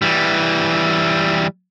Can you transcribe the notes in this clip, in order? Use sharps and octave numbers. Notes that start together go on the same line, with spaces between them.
E3 G3